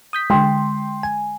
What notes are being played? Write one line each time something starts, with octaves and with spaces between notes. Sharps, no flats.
D#6 G6 B6
D3 G#3 G5 C6
G#5